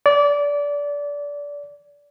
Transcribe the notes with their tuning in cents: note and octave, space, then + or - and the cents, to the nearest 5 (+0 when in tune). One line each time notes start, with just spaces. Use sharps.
D5 -25